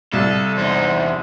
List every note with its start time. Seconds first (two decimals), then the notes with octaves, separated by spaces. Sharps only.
0.13 C2 A4 F5
0.57 E2 D#4 C5